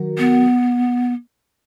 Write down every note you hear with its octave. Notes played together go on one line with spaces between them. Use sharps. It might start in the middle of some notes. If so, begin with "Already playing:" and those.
Already playing: D#3 F#3 F#4 A#4
B3